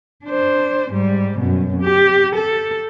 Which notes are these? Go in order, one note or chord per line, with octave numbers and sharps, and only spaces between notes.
D4 C5
G#2 G3
F#2 B2
G4
A4